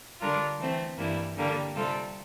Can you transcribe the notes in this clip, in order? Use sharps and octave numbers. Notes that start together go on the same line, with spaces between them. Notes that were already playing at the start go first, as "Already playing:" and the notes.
D3 G3 D4 F4 A#4
E3 A3 C4
G2 E3 G3 A#3 E4
D3 G3 A#3
C3 G3 C4 F4 A4